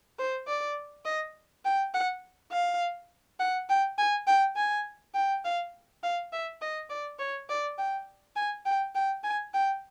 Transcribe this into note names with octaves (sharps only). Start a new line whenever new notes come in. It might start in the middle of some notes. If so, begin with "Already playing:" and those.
C5
D5
D#5
G5
F#5
F5
F#5
G5
G#5
G5
G#5
G5
F5
F5
E5
D#5
D5
C#5
D5
G5
G#5
G5
G5
G#5
G5